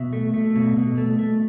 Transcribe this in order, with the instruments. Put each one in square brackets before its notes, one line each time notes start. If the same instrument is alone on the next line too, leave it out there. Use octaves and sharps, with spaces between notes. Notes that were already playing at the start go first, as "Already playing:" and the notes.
Already playing: [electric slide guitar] B2 E5
A3
A3
B2
B2
A3
A3